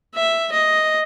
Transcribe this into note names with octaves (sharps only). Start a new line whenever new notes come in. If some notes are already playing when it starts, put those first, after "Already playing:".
E5
D#5